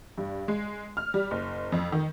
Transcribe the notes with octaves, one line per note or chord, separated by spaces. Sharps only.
G2
G#3
F6
G3
F#1
F2
D#3